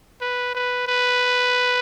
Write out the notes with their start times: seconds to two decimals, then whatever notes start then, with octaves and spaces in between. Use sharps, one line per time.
0.21 B4
0.55 B4
0.87 B4